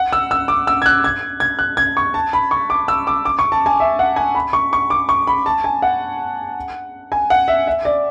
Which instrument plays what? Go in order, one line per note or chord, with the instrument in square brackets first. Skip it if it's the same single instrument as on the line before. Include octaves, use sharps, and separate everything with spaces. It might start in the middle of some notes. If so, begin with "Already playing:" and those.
Already playing: [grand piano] F#5
E6
E6
D6
E6
G#6
F#6
G#6
G#6
F#6
G#6
C#6
A5
B5
C#6
D6
E6
D6
D6
C#6
A5
G#5
E5
F#5
G#5
B5
C#6
C#6
D6
C#6
B5
A5
G#5
F#5
G#5
F#5
E5
E5
D5